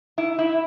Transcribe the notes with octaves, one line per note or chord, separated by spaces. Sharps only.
E4
E4